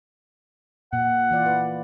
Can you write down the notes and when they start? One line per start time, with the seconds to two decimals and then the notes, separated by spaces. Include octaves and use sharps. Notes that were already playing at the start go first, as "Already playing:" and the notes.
0.93 A#2 F#5
1.31 E3 F4 D5
1.46 B4